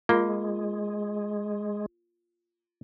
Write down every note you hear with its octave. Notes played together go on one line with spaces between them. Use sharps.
G#3 A#3 F4